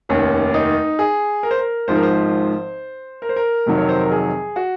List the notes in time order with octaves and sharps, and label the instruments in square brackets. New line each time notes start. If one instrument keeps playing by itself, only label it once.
[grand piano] F1 D#2 D#3 C#4
D#4
G#4
A#4
C5
A#4
G#1 G#2 F3 C5
A#4
C5
A#4
C5
A#4
F2 C3 D#3 F#3
C#5
C5
A#4
G#4
F#4